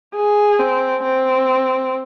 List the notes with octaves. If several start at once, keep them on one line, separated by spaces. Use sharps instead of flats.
G#4
C4
C4